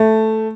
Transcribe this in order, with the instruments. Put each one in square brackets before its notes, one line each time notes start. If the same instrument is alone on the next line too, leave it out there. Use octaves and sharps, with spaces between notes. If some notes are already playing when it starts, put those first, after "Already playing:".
Already playing: [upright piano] A3